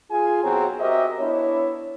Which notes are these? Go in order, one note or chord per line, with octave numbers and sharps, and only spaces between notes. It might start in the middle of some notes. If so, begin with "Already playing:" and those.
F4 G#4 G#5
B1 C4 F#4 G#4 C#5 A#5
F#4 G4 A#4 C5 D#5 E5
B3 D4 E4 C#5